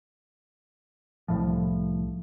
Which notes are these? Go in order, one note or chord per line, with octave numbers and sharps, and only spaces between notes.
C2 A2 F3